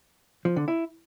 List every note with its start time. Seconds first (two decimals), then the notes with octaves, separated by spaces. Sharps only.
0.45 F3
0.56 D3
0.68 E4